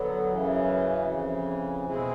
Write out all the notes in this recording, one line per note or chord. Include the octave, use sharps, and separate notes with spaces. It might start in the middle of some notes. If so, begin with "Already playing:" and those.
Already playing: D3 F#3 B3
F#2 C#3 E3
F2 C#3 E3
B2 G#3 C4 E4 G#4